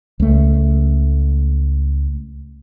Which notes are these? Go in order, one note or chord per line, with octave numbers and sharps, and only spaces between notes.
C#2 A3